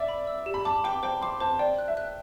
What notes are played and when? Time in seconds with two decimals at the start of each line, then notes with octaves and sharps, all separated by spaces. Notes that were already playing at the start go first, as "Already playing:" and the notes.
Already playing: D5 E5
0.08 B5
0.27 E6
0.46 G4
0.54 B5
0.65 A5 D6
0.84 G5 D6
1.03 C5 G5
1.22 C6 D6
1.40 C5 A5
1.59 D5 G5
1.78 F#6
1.88 E5
1.97 F#6